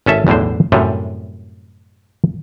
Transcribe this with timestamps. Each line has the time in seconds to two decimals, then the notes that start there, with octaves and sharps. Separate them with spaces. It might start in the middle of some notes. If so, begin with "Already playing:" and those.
0.06 G#1 C#4 A4 E5
0.27 B1 E2 A2 D3 C5
0.72 F#2 A2 C3 G3